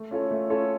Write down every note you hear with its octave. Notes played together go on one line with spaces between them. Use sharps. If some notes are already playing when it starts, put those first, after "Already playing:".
Already playing: A3
C#4 F4 A4 C#5
A3
C#4 F4 A4 C#5